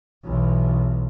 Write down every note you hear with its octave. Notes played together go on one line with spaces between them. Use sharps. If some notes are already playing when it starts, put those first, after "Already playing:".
B1 E2